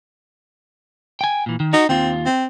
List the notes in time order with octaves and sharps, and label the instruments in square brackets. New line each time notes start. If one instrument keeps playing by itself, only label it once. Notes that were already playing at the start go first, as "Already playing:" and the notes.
[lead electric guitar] G5 G#5
A#2 E3
D#3
[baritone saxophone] D#4 [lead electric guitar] F#4
[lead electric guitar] D#2 F4 [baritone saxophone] C4
[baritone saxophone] C4